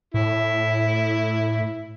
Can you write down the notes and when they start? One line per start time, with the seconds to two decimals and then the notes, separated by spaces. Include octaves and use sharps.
0.14 A2 E4